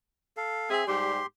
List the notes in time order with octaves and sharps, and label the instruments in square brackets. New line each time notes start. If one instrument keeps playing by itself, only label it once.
[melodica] A4 F5
[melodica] C4 E5 [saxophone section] G#4
[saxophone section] G#2 G3 [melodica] G4 C6